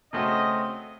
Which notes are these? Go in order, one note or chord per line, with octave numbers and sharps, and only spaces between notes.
C#3 A3 C4 F#4 D#5